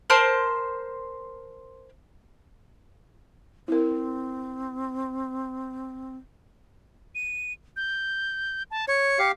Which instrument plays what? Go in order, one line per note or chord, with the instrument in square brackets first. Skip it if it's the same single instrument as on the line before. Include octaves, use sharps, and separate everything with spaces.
[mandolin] A#4 C5 A5 C6
[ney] C4 [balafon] E4 A#4
[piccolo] D#7
G6
A5
[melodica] C#5 [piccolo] C#7
[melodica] G4 F5